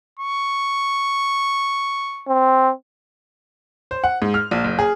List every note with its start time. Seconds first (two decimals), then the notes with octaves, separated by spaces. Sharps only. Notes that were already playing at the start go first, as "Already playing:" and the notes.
0.19 C#6
2.28 C4
3.91 C5
4.04 F#5
4.22 G#2
4.34 F6
4.51 A#1
4.64 F#1
4.79 G#4